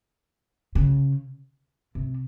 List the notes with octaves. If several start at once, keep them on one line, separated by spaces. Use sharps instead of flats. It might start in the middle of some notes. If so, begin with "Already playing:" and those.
C#3
C3